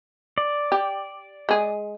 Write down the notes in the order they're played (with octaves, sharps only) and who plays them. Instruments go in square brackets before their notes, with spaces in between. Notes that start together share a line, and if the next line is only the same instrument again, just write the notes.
[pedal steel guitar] D5
[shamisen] G4
G#3 G#4